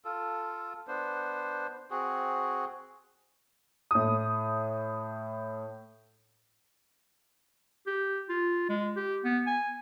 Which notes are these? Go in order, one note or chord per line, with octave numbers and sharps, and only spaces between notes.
F4 A4
B3 D4 C5
C4 F#4 G#4
A2 D#6
G4
F4
G#3
G4
B3
G#5